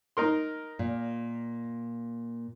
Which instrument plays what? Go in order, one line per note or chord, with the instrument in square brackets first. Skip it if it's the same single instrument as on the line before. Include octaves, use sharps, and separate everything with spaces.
[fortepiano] D#4 A#4 C6
[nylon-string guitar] A#2